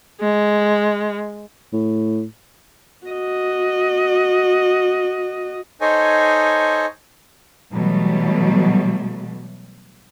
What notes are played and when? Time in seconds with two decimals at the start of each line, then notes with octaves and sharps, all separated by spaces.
0.21 G#3
1.73 A2
3.07 F#4 D#5
5.81 D#4 A4 C5 C#5 D#5 G#5
7.71 B2 E3 F#3 G3 A3